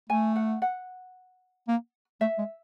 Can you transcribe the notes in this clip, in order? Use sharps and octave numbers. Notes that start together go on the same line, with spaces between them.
A3 G#5
F#5
F#5
A#3
A3 E5
G#3